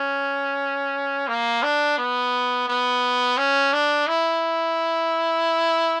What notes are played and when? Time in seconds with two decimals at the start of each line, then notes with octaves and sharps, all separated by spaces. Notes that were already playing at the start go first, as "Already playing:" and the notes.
Already playing: C#4
1.28 A#3
1.63 D4
1.98 B3
2.68 B3
3.37 C#4
3.73 D4
4.07 E4